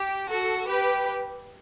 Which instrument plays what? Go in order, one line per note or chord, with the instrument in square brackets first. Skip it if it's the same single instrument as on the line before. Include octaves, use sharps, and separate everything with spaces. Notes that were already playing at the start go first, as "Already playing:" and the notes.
Already playing: [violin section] G4
F#4 A4
G4 B4